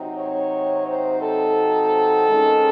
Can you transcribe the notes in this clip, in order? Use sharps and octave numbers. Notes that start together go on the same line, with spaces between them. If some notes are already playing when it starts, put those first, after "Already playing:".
Already playing: C3 F#3 C4 D#4
C#5
C5
A4
G#2 D#3 G#3 C#4